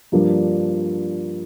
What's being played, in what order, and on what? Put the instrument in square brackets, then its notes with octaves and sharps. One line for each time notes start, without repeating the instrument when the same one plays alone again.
[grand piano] G2 F3 A#3 D4